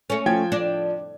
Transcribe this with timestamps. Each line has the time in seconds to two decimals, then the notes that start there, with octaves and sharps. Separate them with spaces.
0.10 A3 C#4
0.26 F3 G5 G#6
0.52 D4